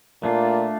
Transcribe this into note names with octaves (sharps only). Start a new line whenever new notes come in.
A#2 A3 D4 F4